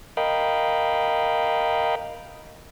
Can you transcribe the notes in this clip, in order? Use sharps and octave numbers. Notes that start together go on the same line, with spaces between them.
A#4 D#5 F5 G5 B5